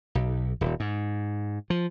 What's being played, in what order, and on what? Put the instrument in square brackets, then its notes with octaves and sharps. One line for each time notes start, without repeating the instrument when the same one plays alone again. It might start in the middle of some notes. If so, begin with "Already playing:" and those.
[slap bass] B1
D#1
G#2
F3